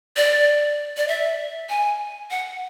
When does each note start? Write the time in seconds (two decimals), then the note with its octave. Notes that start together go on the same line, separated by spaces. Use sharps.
0.17 D5
0.97 D5
1.08 E5
1.69 G#5
2.31 F#5